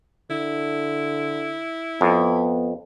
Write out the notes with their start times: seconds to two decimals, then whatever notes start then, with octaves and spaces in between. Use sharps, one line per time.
0.30 D3 E4
2.01 F2 B3